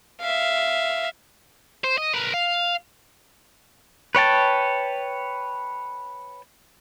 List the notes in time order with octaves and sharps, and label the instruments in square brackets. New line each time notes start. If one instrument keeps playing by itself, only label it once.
[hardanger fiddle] E5 F5
[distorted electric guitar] C5
D#5
A#4 B4
F5
[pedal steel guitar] B4 C#5 G5 A5